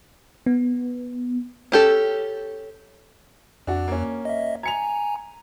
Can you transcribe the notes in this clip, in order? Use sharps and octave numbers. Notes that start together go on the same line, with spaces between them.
B3
C#4 G4 A4
F2 D4 F#4
A#3 C#4
D#5 E5
G#5 A#5 G#6 C#7 F7